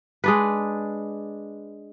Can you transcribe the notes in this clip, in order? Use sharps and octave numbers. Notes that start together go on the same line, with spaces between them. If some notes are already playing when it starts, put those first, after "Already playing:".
G#3 D4 B4